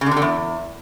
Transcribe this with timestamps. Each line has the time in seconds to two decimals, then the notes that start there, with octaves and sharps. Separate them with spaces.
0.01 C#3
0.06 D3
0.11 C3
0.17 D3
0.22 E2